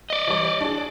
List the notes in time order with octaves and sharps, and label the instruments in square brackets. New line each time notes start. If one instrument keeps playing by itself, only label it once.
[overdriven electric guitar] D5 D#5
[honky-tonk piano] E3 G3 C#5
D4 G#4